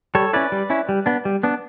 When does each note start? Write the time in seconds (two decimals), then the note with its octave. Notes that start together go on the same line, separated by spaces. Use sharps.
0.15 G3 A4 C#5
0.33 C#4 E4 B4 D5
0.52 G3
0.70 C#4 E4
0.89 G3
1.06 B3 D4
1.25 G3
1.43 B3 D4